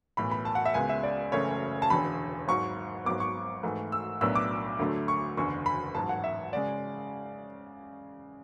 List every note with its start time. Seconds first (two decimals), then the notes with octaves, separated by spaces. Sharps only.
0.17 B1 A2 E3 B3 B5
0.31 B5
0.45 A5
0.55 F#5
0.65 E5
0.74 C#2 C#3 G#3 B3 G#5
0.89 E5
1.03 D5
1.32 F#1 F#2 C#3 E3 A3 C#5
1.82 A5
1.90 E1 E2 D3 B5
2.48 G#1 G#2 F#3 C#6
3.05 G#1 G#2 F#3 B3 D6
3.20 C#6
3.63 G#2 E3 A3
3.92 E6
4.21 B1 A2 F#3 B3 D4 E6
4.35 D6
4.79 D2 D3 F#3 A3
5.08 C#6
5.37 F#1 E2 D3 C#6
5.66 B5
5.95 A1 G#2 F#3 A5
6.09 F#5
6.24 E5
6.53 C#3 G#3 D5